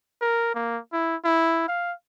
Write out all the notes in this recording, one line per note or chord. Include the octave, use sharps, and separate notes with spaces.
A#4
A#3
E4
E4
F5